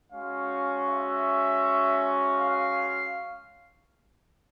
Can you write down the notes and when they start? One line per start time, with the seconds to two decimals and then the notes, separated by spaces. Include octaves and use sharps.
0.11 G#3 C#4 F#4 F5
0.87 E5
2.39 F5